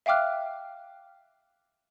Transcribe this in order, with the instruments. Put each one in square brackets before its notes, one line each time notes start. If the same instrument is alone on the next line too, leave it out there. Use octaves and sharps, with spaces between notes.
[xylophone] E5 F5 G5 D6 F6 F#6